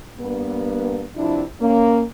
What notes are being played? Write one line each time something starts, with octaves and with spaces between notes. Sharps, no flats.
G2 A#3 B3
G2 C3 F3 D4 E4
A#3 C#4